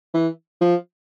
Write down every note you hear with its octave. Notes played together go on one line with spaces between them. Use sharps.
E3
F3